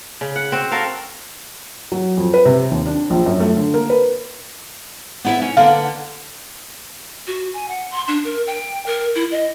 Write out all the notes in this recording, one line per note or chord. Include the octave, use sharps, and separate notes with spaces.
C#3
F#5
C4 F#4
F#4 A4 A#4 F5
F#3
F2
B4
C3
D#2
D4
A#1
F#2
A3
D3
A#3
B4
B3 E4 E5
C#4
D3 A#3 B3 F5
F#4
G#5
F#5
C6
D4
A#4
G5
A#4
E4
D#5